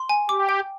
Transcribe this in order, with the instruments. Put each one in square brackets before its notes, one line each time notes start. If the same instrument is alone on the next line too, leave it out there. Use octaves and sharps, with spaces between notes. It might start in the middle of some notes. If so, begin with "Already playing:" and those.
Already playing: [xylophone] C6
G#5
[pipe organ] G4 [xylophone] D6
[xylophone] G5